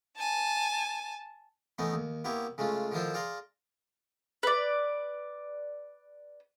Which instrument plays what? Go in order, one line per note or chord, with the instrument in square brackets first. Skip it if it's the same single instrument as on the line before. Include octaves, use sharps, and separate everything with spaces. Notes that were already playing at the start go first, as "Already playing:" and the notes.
[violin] G#5 A5
[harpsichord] E3 A3 B3 C#4 D#4
D#2
A#3 B3 E4 G4 C#5
C#3 G#3 A3 C#4 F4
D3 D#3 F3 E4 F4 C5
G#4 D5 F5 A#5 C6
[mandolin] B4 D5